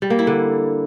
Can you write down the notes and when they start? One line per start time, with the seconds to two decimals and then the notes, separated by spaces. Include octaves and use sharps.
0.02 G3
0.10 A#3
0.19 E4
0.27 D3